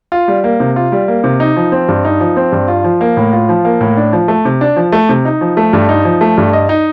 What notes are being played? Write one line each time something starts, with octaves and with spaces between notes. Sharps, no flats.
F4
G3
A#3
C3
F4
G3
A#3
C3
D#4
F3
C4
G2
D#4
F3
C4
G2
F4
F3
A#3
A2
F4
F3
A#3
A2
D4
F3
A3
C3
D4
F3
A3
C3
D#4
F3
A3
G2
D#4
F3
A3
G2
D#5
D#4